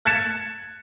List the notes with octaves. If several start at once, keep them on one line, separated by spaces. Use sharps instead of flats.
F#6 G#6 A6 C#7 E7